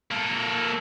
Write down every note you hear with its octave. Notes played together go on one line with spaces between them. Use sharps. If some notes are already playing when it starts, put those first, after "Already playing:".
A#3 A4